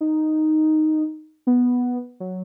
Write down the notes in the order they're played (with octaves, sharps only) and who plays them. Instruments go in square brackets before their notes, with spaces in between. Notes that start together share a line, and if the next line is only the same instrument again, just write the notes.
[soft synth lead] D#4
B3
F#3